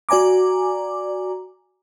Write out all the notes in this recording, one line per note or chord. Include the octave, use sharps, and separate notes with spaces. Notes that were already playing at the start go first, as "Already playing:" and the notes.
F#4 D5 G#5 A#5 D6